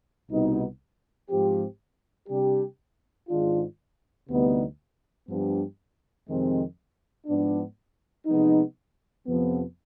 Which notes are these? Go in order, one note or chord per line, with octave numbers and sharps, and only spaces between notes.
C2 B2 B3 D#4
G#2 F3 C4 G4
C3 G3 D4 G4
G#2 D#3 G#3 D4 F4
D2 C3 G3 B3 D#4
G2 F3 B3 D4 G4
F2 C3 D#3 G#3 C4
G#2 F3 B3 D4
C3 F3 G#3 B3 D#4
F2 C3 F3 B3